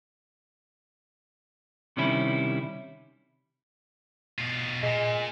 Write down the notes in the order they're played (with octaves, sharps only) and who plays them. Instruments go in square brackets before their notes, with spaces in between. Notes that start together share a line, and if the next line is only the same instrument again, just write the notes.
[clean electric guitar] C3 D#3 G3 C#4 E4
[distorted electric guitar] B2 F4
[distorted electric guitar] A#2 [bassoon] G#3